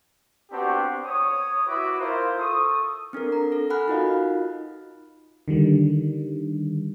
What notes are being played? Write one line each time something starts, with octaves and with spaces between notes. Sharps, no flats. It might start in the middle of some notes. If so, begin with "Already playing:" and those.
B3 C4 D4 F#4 G4
C#5 D#6
E4 F#4 B4 E5 B5 D6
E4 F4 A#4 C5
A4 C#6 D#6
C4 D4 A4 A#4
A#5
A4
F#5 G#5 B5 F6 F#6
D#4 F4 F#4 A#4 D#5 F5
D3 D#3 G3